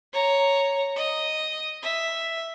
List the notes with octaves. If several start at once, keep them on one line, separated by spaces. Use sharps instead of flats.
C#5 A#5
D#5
E5